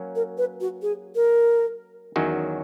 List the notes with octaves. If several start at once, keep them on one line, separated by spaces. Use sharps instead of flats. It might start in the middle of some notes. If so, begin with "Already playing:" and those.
Already playing: F#3 A#3 C#4
A#4
B4
F#4
G#4
A#4
E2 D#3 F#3 C#4 F#4